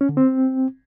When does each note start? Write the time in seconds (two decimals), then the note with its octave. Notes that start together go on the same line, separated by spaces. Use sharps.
0.01 C#4
0.09 D3
0.17 C4